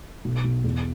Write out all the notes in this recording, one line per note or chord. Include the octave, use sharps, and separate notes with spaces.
B1
B1
E2